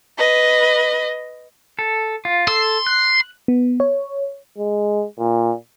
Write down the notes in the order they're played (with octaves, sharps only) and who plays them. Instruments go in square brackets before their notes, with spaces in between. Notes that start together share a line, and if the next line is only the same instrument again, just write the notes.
[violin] B4 D#5
[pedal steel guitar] A4
F4
[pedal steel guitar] A4 E6 [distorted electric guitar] C6
[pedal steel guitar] F#6
[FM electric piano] B3
C#5
[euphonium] G#3
A#2